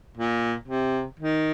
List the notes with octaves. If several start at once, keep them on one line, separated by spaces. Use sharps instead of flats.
A#2
C3
D#3